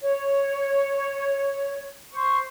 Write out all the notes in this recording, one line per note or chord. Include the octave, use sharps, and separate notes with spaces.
C#5
C5 C#6